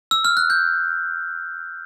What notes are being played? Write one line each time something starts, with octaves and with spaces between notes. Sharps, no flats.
E6
F6
F#6
G6